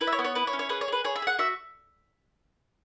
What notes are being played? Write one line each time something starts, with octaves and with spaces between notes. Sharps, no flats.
E4 B4
E5
C#5
B3
C#5
E4 B4
C#5
C#4
C#5
G#4 B4
C#5
G#4 B4
G#4 C#5
E5
G#4 F#5
F#4 E5